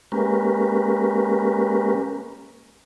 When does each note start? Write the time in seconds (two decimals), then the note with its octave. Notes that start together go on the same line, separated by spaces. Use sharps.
0.12 G#3 A#3 C#4 G4 A#4 B4